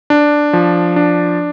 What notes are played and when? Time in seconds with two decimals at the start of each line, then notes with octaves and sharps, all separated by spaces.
0.10 D4
0.53 F3
0.96 D4